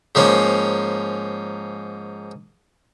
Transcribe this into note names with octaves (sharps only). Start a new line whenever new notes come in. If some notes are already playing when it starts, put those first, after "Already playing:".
G#2 F3 A#3 C#4